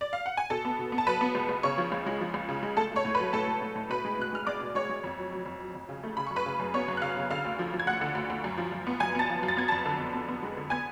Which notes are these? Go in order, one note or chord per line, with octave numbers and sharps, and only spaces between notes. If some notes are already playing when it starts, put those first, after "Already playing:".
D5
F5
F#5
G#5
B2 A4 A5
B3
B2
B3
A5
F#3 B4 B5
B3
C#2
C#2
C#3 C#5 C#6
F3
C#2
G#3
F3
C#2
C#3
G#3
A3 A4 A5
A3 C#5 C#6
A2
B4 B5
F#3
A2 A4 A5
A2
A2
A2
B2 B4 B5
G#3
B2 F#6
G#3 F6
G#3 D5 D6
B2
G#3 C#5 C#6
G#3
F2
F#3
F#3
F2
F#3
F2
C#3
A3
C#3 B5
F#2 C#6
B4 B5
C#3
F#2
B3 C#5 C#6
F#2
F#6
C#3 F5 F6
C#3
D3 F5 F6
D2
F3
F3
G#6
D2 F#5 F#6
D3
D2
D2
F#2
F3
F#2
B3
F#2 G#5 G#6
B3 A5 A6
F3
F#2
A6
B3 G#6
F2 A5 A6
D3
F2
B3
B3
G#3
D3
B3 G#5 G#6